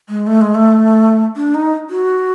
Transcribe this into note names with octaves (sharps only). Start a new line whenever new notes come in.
G#3
A3
G#3
A3
D4
D#4
F#4